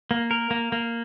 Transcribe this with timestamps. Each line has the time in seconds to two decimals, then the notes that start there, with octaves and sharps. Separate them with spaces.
0.11 A#3
0.31 A#4
0.51 A#3
0.72 A#3